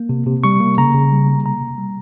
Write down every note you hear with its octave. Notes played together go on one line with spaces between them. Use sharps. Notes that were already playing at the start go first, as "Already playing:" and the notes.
Already playing: A#3
C3
C3
G3 C#6
A#3
C#3 A#5
C#3
G3
A#3
C3 A#5
C3
G3